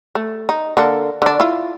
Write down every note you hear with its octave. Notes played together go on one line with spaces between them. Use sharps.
A3
D#4
D3 A#3 A4
D3 D4
E4 F4